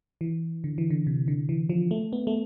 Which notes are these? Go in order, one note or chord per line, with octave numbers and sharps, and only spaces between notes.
E3
D3
E3
D3
C3
D3
E3
F3
A3
B3
A3